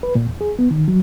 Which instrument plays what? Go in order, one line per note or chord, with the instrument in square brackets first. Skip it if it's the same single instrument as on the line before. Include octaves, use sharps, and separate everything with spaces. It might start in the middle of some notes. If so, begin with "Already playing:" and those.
[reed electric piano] B4
A#2
E2
G#4
B3
D#3
F#3